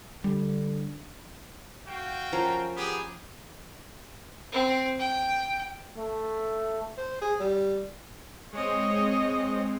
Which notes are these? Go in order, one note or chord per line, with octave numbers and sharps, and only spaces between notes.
D3 G3
F#4 F5 G5
F3 C#4 A#4
B3 G4 G#4
C4
G5
A3
C5
G#4
G3
G#3 C4 C#5 D#5